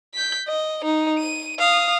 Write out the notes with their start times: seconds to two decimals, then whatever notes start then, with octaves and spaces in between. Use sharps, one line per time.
0.14 G6 B6
0.48 D#5
0.85 D#4
1.18 D#7
1.59 F5 D#6